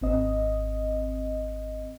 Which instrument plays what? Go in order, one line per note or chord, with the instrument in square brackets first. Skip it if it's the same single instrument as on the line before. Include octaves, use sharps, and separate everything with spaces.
[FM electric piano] G#1 C4 D#5